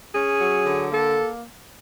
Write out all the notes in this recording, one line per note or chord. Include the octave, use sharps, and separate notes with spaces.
C#4 G#4
F#3
D3
A#3 A4